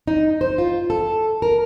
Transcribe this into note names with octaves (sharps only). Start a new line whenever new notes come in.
D#4
C5
F4
A4
A#4